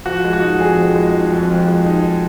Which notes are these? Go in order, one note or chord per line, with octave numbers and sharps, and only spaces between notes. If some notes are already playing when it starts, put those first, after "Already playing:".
F3 F#4
G#3
F#4
D#4
F2 G#4
F3
G#3
D#4
F2
F3
G#3
D#4